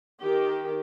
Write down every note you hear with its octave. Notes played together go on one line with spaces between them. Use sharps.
D#3 G4